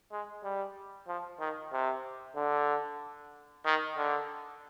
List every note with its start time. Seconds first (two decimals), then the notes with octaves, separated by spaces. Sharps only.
0.12 G#3
0.44 G3
1.08 F3
1.40 D#3
1.73 C3
2.36 D3
3.66 D#3
3.97 D3